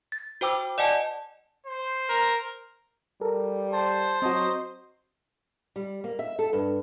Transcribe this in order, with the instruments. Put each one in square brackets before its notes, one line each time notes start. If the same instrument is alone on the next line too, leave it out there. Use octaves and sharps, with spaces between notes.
[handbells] A6
F#4 C5 G5 D6 E6
D5 D#5 F#5 G#5 A5
[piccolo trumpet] C5
[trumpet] A#4
[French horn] G3 [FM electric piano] A4 A#4
[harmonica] C5 [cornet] A5
[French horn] F#3 [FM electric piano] C4 F#4 [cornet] D#5
[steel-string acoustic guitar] G3
A#3
E5
A4
G2